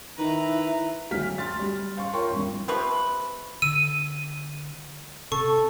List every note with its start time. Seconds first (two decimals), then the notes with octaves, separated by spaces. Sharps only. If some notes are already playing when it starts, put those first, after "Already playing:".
0.18 D#3 E4 B4 A#5
1.11 D2 F#3 F6 B6
1.38 C6 F6 A6
1.59 G3
1.97 F5 C6 C#6
2.13 F4 A#4 C#5 G5 C6 C#6
2.31 E2 G2
2.68 C3 F3 B4 C#6
3.62 D3 E6 D#7
5.32 C3 A4 C#6